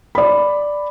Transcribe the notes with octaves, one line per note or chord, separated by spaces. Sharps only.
D5 B5